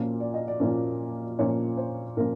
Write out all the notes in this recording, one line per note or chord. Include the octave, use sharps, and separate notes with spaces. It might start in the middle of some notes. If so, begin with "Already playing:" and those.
Already playing: A#2 F3 A#3 C#4
D5
D#5
D5
A#2 F3 A#3 C#4
A#2 F3 A#3 C#4 C#5
C5
A#2 F3 A#3 C#4 A#4